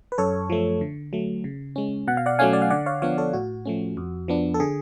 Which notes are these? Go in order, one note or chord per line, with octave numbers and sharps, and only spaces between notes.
B4
F#2 A4 C#5
F3 A3
D3
F#3 A3
C#3
G#3 C#4
B2 F#5
F5
D5 F#5
F#3 A3 C#4 F5 G#5
D5
F5
D3 D5 F#5
C#5 F5
F3 B3 D4 C#5 F5
A4 C#5
A2 F#4
F3 A3 C#4
F2
F3 B3 D4
A4
D3 G#4